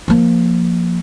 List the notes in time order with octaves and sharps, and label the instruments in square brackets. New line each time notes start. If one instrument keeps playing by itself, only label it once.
[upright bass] F3 A#3